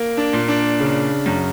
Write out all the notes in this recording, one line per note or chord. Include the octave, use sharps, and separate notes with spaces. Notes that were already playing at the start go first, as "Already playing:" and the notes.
Already playing: A#3
D4
A#2
D4
C#3
F#2